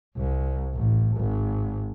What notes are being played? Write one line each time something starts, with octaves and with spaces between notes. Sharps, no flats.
C2
A1
G#1